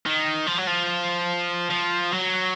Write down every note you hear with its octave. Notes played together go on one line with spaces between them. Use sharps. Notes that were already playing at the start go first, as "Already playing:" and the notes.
D#3
F3
F#3
F3
F3
F#3